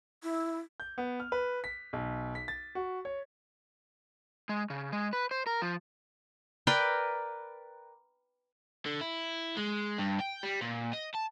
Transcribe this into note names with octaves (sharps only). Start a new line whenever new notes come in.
E4
G6
B3
F6
B4
B6
B1
B6
A6
F#4
C#5
G#3
C#3
G#3
B4
C5
A#4
F3
A#4 B4 D5 G5
D3
E4
G#3
G2
G5
G3
A#2
D#5
A5